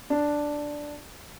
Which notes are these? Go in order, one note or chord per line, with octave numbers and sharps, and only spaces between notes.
D4